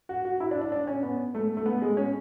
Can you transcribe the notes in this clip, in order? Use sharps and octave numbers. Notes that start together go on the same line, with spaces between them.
F#4
F#4
E4
D4
D4
D4
C#4
B3
A3
A3
B3
G#3
C#4